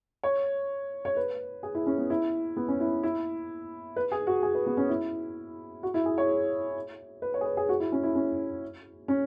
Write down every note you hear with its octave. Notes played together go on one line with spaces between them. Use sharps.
C#5
C#5
B4
G#4
E4
C#4
B3
E4
B3
C#4
E4
E4
B4
G#4
F#4
G#4
B4
B3
C#4
E4
F#4
E4
G#4
C#5
B4
C#5
G#4
B4
G#4
F#4
E4
C#4
E4
C#4
C#4